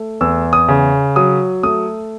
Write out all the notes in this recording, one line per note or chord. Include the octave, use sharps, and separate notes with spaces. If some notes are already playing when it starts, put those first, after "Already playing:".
Already playing: A3
E2 E6
D#6
C#3
F#3 D#6
A3 D#6